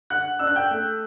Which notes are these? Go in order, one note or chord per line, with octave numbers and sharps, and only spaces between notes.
D3 F#5 F#6
D4 E6
F#6
G5 G6
A3